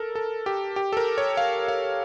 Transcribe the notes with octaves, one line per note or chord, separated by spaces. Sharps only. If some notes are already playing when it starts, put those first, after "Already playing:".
Already playing: A4 A#4
A4
G4
G4
A4
A#4
C#5
F5
F5